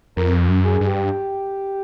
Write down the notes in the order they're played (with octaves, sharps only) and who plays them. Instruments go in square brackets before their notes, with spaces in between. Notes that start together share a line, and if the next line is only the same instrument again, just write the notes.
[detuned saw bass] F2 [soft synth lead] A#4
[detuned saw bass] F#2
[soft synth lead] G#4
[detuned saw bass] G2 [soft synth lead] G#4
[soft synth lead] G4